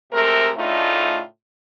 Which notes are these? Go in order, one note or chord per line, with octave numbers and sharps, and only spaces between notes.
C3 G#3 A3 C4 A#4
A2 C#3 A3 D4 D#4 F4